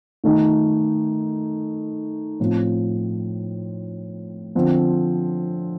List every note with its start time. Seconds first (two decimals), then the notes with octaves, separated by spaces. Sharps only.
0.24 D#3 A3 D#4
2.40 A2 F3 C4 F4
4.55 D3 F3 C4